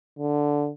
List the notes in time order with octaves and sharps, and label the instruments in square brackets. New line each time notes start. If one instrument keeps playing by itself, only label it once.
[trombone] D3